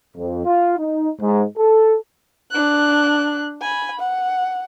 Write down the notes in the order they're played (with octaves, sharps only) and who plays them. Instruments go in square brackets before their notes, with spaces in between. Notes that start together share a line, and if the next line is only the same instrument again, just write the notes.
[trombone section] F2
F4
D#4
G#2
A4
[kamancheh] D4 F#6
G#5 B5
F#5